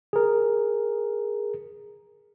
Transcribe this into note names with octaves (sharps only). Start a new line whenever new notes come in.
G#4 A#4